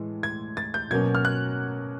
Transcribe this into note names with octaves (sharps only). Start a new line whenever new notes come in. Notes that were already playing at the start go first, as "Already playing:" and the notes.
Already playing: A2 E3 G#3
G#6
A6
G6
B2 F#3 A#3 C#4 G#6
F6
F#6